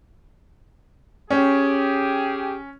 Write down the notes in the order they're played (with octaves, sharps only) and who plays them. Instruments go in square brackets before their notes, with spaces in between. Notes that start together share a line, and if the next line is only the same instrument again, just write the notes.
[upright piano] C#4 [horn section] G4 G#4